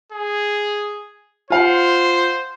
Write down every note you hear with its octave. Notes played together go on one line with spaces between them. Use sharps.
G#4
F4 C5 F5 F#5